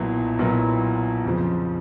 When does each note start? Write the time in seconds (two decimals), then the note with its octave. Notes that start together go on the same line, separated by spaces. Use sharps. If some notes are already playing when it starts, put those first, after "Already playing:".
Already playing: B1 A#2 F#3 B3 E4
0.39 B1 A#2 F#3 B3 E4
1.24 F2 C#3 F3